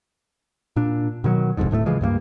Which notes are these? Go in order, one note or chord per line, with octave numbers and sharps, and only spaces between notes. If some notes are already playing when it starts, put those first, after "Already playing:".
A#2 D4
B2 D#3 E3 F#3
E1 C2 F2 G#2
D1 A2 G3 A3
C#3 E3 F3 G#3
C#2 G2 A3 A#3